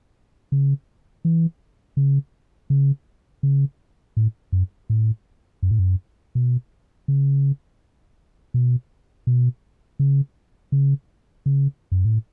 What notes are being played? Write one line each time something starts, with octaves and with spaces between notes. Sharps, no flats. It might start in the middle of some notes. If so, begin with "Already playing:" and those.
C#3
E3
C#3
C#3
C#3
A2
F#2
A2
F#2
A2
F#2
B2
C#3
B2
B2
C#3
C#3
C#3
F#2
A2